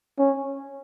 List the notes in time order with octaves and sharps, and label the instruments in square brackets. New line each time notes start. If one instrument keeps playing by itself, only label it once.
[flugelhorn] C#4